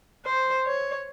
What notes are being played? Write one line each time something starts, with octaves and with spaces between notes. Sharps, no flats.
C5
C#5